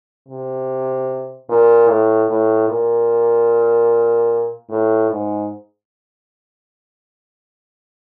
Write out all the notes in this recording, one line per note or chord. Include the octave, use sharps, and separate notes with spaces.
C3
A#2
A2
A2
A#2
A2
G#2